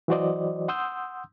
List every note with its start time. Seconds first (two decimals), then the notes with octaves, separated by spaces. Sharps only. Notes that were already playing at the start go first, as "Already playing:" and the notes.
0.08 E3 F#3 F#4 C5 D5 D#5
0.68 F#5 C6 D#6 E6 G6